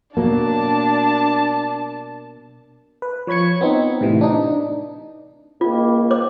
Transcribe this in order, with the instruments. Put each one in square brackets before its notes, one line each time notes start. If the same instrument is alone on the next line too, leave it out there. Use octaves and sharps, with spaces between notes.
[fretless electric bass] B2 F#3 A#3 [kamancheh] D4 A5
[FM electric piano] B4
F3 C#5 B5 G#6 C#7
B3 C4 D#4
A2 C3 E3
D4 D#4
[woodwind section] C#2 D#3 A#3 [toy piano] F4
[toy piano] C#5 D6